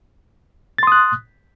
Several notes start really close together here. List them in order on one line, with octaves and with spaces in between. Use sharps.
A6 C6 D#6 F#6